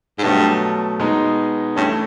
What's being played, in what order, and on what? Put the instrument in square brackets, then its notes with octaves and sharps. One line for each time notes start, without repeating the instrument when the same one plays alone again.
[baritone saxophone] G#2
[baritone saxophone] G2 [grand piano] B2 F#3 A3
[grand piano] B2 G#3 B3 D#4
[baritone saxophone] G2 [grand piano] E3 A3 C#4 E4